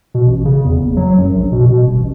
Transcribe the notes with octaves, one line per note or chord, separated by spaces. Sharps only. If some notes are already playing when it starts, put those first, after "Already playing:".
B2
A1
C#3
E2
F#1
F#3
F#2
A#1
B2
B2
D#1
A1